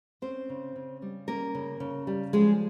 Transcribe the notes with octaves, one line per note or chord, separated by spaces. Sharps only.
C4 C#4 C5
C#3
C#3
G3
A#3 C#4 A#4
C#3
C#3
G3
F3 G#3 G#4